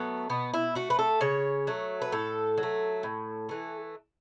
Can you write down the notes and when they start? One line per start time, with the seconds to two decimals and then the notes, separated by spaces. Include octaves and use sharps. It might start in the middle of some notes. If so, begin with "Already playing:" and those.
Already playing: F#3 A3 B3
0.29 B2 B3
0.54 E4
0.75 A3 F#4
0.90 B4
0.99 A4
1.21 C#3 C#5
1.67 F#3 A3
2.02 B4
2.12 A2 A4
2.58 F#3
2.63 A3
3.03 A2
3.49 E3 A3